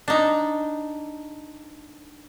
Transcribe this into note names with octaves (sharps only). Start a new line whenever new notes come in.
D4 D#4